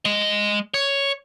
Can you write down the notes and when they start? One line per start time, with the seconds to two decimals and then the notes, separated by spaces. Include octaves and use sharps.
0.05 G#3 D#5
0.74 C#5